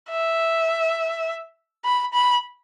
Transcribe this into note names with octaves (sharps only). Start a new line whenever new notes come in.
E5
B5
B5